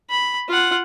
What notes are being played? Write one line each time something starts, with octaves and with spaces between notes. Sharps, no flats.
B5
F4 F#5